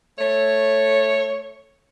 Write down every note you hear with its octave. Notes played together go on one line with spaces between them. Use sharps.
A3 C#5